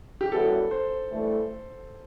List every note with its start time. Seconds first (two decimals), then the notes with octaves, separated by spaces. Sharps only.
0.21 G4
0.32 F#2 E3 G3 B3 F#4 A4
0.71 C5
1.11 G2 E3 A3